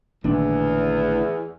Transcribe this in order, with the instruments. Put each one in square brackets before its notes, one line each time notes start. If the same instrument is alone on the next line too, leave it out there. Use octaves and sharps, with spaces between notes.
[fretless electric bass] A1 D4 [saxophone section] E2 [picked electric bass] A#2 D3 D#3